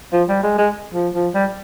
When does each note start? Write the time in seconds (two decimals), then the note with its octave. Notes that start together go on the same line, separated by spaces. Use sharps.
0.13 F3
0.28 G3
0.43 G#3
0.58 G#3
0.94 F3
1.14 F3
1.34 G3